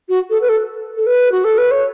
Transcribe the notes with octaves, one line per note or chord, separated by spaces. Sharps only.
F#4
A4
B4
A4
A4
B4
F#4
A4
B4
C#5